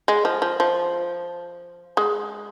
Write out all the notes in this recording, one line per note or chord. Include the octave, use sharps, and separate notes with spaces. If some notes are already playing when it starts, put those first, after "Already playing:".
G#3
F3
F3
F3
G#3